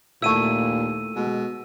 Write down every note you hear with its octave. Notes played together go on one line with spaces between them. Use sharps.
D#2 A#2 A3 E4 E6 D#7
B2 G#3